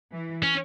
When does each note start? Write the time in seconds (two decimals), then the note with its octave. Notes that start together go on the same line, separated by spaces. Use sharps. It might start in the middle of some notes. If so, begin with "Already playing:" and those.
0.12 E3
0.43 C#4